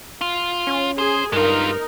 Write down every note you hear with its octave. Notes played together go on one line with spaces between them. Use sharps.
F4
C#4
G#4 C5
G2 G#3 D#4 F4 A#4